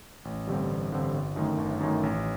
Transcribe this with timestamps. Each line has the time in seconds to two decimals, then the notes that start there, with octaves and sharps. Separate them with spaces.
0.25 A1
0.47 G2 D3 G3 C4
0.69 A1
0.92 G2 D3 G3 C4
1.14 G1
1.36 F#2 D#3 A3
1.58 G1
1.80 F#2 D#3 A3
2.03 A1